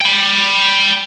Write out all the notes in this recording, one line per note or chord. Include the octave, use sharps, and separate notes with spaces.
G5 B5